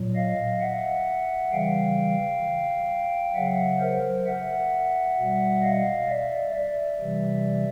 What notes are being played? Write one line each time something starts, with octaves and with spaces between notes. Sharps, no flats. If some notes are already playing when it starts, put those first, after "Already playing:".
Already playing: A#2 F#3
D#5 F5
E5 F#5
C#3 E3 G3 F5 G5
C#3 F#3 E5 F#5
A#4 C5
E5 F#5
B2 G3
D#5 F5
D5 E5
D5 E5
C3 E3 G3